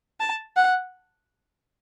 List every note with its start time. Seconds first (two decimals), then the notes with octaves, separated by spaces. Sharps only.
0.20 A5
0.56 F#5